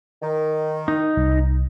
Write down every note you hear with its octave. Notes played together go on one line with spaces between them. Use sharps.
D#3
D#4
C2